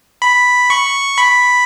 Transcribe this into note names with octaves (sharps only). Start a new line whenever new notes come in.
B5
C#6
B5